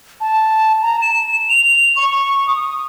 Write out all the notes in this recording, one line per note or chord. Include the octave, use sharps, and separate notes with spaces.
A5
A#5
E7
F7
C#6
D#6